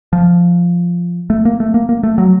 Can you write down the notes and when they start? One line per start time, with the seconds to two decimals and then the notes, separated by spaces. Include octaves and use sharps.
0.13 F3
1.30 A3
1.45 A#3
1.60 A3
1.74 A#3
1.89 A#3
2.03 A3
2.18 F#3